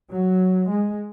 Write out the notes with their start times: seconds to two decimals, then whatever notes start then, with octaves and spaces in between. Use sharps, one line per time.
0.12 F#3
0.70 G#3